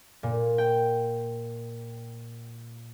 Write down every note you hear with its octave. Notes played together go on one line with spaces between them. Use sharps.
A#2
G5